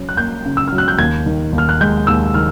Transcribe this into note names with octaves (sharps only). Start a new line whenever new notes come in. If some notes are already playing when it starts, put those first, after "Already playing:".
Already playing: F#3 C#4
F#6
A#3 G6
C#3
E6
F#3 F6
F#6
G6
D#2 G#6
D#3
D#2
F6
F#6
G#3 G6
D#2 E6
D#3 F6